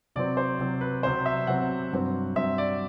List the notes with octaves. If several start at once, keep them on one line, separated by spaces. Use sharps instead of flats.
C3 F#3 C4 D5
C5
C3 F#3 C4
B4
C3 F#3 C4 C5
E5
C3 F#3 C4 F#5
G2 F#3 C4
G2 F#3 C4 E5
D5